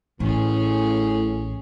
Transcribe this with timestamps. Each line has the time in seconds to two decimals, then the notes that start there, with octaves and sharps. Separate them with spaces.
0.20 A1 A2 C#4 G#4